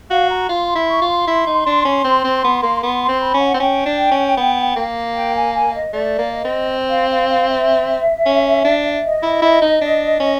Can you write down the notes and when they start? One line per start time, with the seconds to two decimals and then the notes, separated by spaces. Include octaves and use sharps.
0.10 F#4 F5
0.30 A#5
0.49 F4 C6
0.69 C6
0.75 E4
0.88 C#6
1.01 F4
1.08 C6
1.27 E4
1.47 D#4
1.66 D4
1.85 C#4
2.04 C4
2.24 C4
2.44 B3
2.63 A#3
2.83 B3 C6
3.02 C6
3.08 C4
3.22 B5
3.34 C#4
3.41 F#5
3.54 C4
3.60 C#4 G5
3.86 D4
4.11 C#4
4.37 B3
4.76 A#3
5.15 G5
5.35 G#5
5.54 G#5
5.73 D#5
5.93 A3 D5
6.18 A#3
6.31 D#5
6.45 C4
6.90 F5
7.09 F5
7.29 F5
7.48 E5
8.26 C#4
8.65 D4
9.03 D#5
9.23 E4
9.42 E4
9.61 D#4
9.81 D4
10.19 C#4